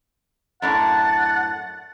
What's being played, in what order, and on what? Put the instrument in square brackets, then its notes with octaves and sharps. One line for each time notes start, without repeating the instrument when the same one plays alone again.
[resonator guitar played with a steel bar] F#2 A2 D4 [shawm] F#5 [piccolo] A6